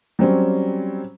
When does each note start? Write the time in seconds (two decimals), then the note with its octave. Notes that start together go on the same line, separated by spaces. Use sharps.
0.19 F#3 G3 C4 C#4